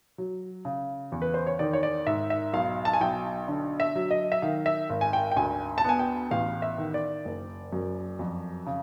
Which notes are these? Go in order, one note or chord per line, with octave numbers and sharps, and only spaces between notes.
F#3
C#3
E2
B4
C5
C#5
D#3 D5
C#5
D5
G#2 E5
E5
B1 F5
A5
G#5
B1 G5
D3
E5
F#3
D#5
E5
D#3 F5
E5
G#1
G#5
G5
G5
D2 G#5
A5
B3 G#5
G5
A1 F5
E5
D#3
D5
F#1
F#2
F2
C#3